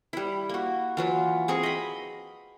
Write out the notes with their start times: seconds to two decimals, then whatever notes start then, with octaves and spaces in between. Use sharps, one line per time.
0.13 G3 E4
0.49 A#3 F#4
0.97 E3 F#3 F4
1.48 C4 G#4 A#4 C#6
1.63 D#5 B5